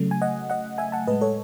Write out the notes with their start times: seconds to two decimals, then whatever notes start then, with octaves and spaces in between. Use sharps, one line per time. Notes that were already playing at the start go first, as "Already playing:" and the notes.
Already playing: C#3 F#3 A3
0.11 G#5
0.22 D#5 F#5
0.50 D#5 F#5
0.78 E5 G#5
0.92 F#5 A5
1.07 A2 G#3 B4 D#5
1.21 A4 C#5